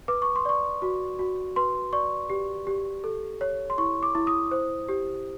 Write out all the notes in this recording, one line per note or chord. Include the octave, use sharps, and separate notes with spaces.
B4 D6
C#6
C6
D5 C#6
F#4
F#4
B4 C6
D5 C#6
G4
G4
A4
C#5
C6
E4 C#6
D6
E4
D#6
C5
G4